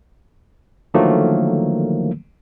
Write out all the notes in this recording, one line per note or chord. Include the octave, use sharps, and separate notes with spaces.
D3 D#3 F3 F#3 A3 A#3